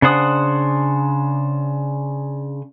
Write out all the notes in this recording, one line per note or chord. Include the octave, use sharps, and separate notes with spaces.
C#3 D4 C5 F#5 D#6